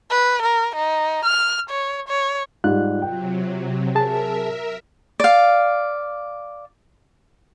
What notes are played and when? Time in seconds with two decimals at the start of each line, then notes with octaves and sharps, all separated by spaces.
0.10 B4
0.42 A#4
0.76 D#4
1.25 F6
1.70 C#5
2.08 C#5
2.64 G#2 G3 F4 F#6
3.02 C3 F#3 G5
3.95 G#4 A#4 E5 A5
5.20 D5 F5